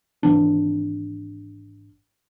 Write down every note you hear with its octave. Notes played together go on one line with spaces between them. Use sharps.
G#1 F2 E3 D4